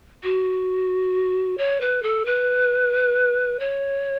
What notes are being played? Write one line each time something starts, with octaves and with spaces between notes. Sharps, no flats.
F#4
C#5
B4
A4
B4
C#5